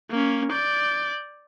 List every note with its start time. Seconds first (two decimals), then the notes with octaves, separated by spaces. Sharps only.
0.10 A#3 C#4
0.52 D5 G6